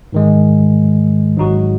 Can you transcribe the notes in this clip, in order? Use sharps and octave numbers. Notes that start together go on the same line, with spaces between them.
G#2 D#3 G#3
G#1 G#2 F#3 D#4 F#4